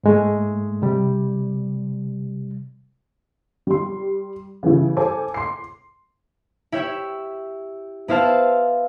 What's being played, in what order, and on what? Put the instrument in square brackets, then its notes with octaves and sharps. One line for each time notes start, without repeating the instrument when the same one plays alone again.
[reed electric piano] G#2 G#3 A3
C3 G3
[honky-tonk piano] G3 C6
C#3 E3 G3 E4
A4 C5 G#5 D6
C6 C7
[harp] E4 G4 C#5 E5
B3 E4 C5 F5 A5